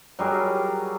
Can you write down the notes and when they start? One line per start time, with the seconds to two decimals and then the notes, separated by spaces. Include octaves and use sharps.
0.19 F#3 G3 G#4 A#4